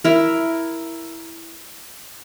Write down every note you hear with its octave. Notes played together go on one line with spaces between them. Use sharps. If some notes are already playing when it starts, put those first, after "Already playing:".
E4 A#4